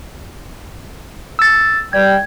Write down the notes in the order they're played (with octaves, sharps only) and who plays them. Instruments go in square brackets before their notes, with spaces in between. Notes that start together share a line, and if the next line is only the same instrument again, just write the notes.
[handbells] E6 A6
[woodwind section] G3 G5 [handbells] G#6